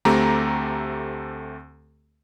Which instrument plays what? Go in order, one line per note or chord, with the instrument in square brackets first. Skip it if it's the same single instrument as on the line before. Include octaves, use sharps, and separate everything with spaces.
[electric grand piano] D2 A3 C4 G4 A#5